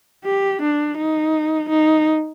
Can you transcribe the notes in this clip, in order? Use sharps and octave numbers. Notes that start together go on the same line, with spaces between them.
G4
D4
D#4
D#4